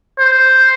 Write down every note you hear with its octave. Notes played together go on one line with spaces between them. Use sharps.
C5